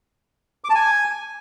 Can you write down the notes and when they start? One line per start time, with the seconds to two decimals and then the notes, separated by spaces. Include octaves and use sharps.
0.64 D6
0.70 A5
0.75 G#5